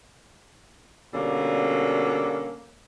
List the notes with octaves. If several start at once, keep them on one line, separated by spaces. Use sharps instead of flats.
B2 D3 G3 A#3 C#4